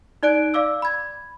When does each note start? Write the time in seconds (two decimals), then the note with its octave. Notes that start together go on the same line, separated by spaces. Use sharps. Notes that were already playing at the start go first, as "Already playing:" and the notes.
0.23 D#4 D5 F#6 D7
0.54 D5 F5 D6 E6
0.82 B5 G#6